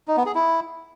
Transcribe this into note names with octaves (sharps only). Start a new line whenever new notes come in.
D#4
B3
G#4
E4